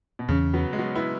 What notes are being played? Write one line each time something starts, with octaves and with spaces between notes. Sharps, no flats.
B2
E2 C#3 E3 C#4
F#3 B3
G#3
F#3 B3
B3 E4